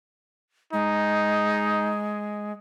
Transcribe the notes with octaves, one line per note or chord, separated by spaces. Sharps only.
G#3 D#4